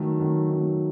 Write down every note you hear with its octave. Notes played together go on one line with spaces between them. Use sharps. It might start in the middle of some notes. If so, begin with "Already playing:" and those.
Already playing: D#3 F#3 A3
D#3 F#3 A3
D#3 F#3 A3